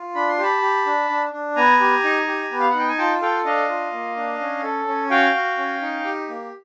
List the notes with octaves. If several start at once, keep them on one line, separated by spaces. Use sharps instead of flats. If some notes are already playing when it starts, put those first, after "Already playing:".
Already playing: F4
D4 B5
C6
G4 A5 B5
G4
D4
D4
D4
B3 G#5 A#5
G4
D#4
G4
B3
F5
F#5
D#4 G5
G#5
F4 G5 A5
A4 F5 G5
D4 D#5 F5
F4
A#3
D4
C#4
A4
C#4
F#4 F5 G5
F#4
C#4
D#4
G4
A#3